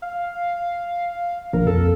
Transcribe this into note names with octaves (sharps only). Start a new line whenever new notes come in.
F5
A#1 A#4
F2 A4